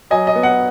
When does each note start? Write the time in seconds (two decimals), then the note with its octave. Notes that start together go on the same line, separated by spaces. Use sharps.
0.11 F#3 D#5 G#5
0.27 D#5
0.35 B3
0.43 F#5